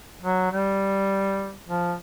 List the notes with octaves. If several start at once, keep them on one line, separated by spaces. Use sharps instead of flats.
F#3
G3
F3